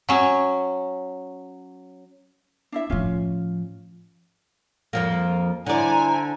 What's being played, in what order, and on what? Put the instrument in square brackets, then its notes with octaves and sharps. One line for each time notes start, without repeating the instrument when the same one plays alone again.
[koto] F#3 C#4
[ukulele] D4 E4 E5
[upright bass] A2 F3 [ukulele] C#4 F4
[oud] F2 F3 A#3
[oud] D3 D5 [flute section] E4 C5 A#5 [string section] G#5